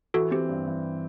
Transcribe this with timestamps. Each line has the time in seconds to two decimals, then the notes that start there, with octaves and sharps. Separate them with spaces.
0.14 E3 F#4 A4
0.31 C4 G4
0.49 G2
0.66 E3